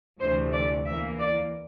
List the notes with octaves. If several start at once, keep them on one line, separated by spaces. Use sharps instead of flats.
D2 C3 E3 A3 C5
D5
E2 E3 A#3 E5
D5